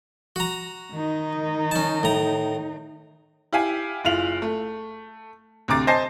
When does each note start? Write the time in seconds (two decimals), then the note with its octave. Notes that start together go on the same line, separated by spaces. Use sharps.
0.36 F#4 A#5
0.92 D#3 D#4
1.71 C#4 A5
2.03 A2 A#5
3.53 E4 G4 F5 G#5
4.04 F#1 E4 F4 F5 F7 F#7
4.42 A3
5.68 D2 C3 A#5 D6 A6
5.87 C5 D#5 G#5 A5 A#6 C7